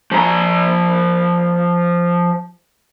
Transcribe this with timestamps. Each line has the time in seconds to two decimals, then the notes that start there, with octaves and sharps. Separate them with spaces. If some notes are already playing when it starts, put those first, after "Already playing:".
0.11 F3 A#5